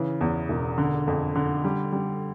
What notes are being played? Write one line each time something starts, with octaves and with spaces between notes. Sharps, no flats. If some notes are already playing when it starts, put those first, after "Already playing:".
Already playing: C#3 E3
E2
E1
D3
F2
D3
G3
G3